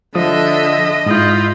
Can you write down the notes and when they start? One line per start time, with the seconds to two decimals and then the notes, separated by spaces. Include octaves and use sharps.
0.15 D3 F3 D#5 E5 D#6
1.06 G#2 E4 F4 D#6 G6